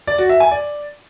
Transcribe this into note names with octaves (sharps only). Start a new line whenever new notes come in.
D5
F#4
E5
G#5
D5